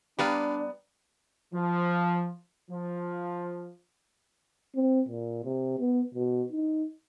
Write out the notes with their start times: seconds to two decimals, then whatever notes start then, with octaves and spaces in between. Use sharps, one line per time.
0.19 G3 B3 D4 G4 B4 D5 F5 A#5
1.54 F3
2.71 F3
4.76 C4
5.09 A#2
5.45 C3
5.80 B3
6.15 B2
6.52 D#4